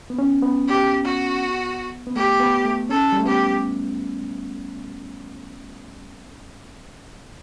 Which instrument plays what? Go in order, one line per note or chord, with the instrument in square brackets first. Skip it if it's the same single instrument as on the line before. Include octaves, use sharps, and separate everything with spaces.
[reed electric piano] B3
C#4
B3
[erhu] G4
F#4
[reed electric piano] B3
[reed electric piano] A3 [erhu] G4
[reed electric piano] B3
A3
[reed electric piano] C#4 [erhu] A4
[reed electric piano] G3
A3
[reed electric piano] B3 [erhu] G4